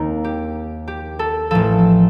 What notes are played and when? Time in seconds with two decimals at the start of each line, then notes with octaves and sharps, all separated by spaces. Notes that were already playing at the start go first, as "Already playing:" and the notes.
Already playing: D#2 D#3 A#3 C4 D#4
0.24 G4
0.88 G4
1.19 A4
1.51 A1 A2 F3 A4